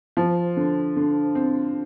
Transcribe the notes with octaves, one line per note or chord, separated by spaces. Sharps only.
F3
D3
D3
C4